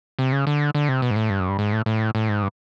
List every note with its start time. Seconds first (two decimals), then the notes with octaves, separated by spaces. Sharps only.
0.19 C3
0.32 C#3
0.47 D3
0.75 D3
0.89 C3
1.02 B2
1.11 G#2
1.16 A2
1.30 G2
1.40 F#2
1.49 G2
1.59 G#2
1.73 A2
1.86 A2
2.15 A2
2.29 G#2
2.43 G2